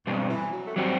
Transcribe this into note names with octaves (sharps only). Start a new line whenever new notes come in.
G2 B2 G3 C4
E3
F#3
A3
F#3 G3 C4 F#4